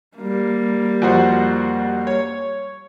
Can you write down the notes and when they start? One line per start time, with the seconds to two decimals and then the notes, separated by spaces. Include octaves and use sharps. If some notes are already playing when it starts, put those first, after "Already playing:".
0.17 G3 A#3
1.02 F2 F#4 C5
2.07 C#5